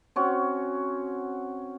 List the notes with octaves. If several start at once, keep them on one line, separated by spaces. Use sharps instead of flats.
C4 C#4 F#4